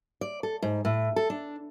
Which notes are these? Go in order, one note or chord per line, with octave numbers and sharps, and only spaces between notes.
D5
A4
G#2
A2
A4
D4